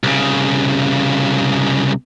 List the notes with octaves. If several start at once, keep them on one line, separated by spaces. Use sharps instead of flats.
C2 C#3